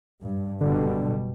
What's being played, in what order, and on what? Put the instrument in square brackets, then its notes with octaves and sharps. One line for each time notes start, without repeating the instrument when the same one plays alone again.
[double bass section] G2
[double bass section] F#1 B2 G3 [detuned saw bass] D3